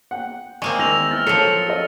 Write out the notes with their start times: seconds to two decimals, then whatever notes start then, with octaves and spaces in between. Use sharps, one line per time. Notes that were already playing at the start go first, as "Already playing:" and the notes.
0.11 F#5 G5
0.62 G#3 A#3 C4 C#6
0.79 E2 D#3 E6 A#6 F7
1.11 E3 F6 A6
1.27 F3 F#3 A4 C5 C#7
1.69 A4 D#5